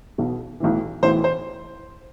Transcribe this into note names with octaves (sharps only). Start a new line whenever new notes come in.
B1 B2
B1 A2 E3
B1 A2 E3 C5
C5